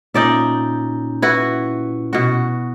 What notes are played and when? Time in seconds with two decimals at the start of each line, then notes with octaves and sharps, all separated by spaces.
0.14 A#2 C#4 D#4 D5 E5 G6
1.22 E4 F#4 B4
2.13 B2 F#4